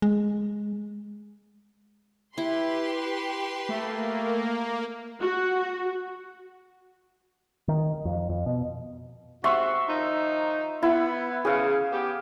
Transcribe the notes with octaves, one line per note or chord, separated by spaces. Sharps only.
G#3
E4 G4 B4 C6
A3 A#3
F#4
D#3
F2
F2
B2
G#2 C3 F#4 E5 C6 C#6
D#3 F3 D#4
B3 E4
E2 C#3 G#4 F5
B3 G4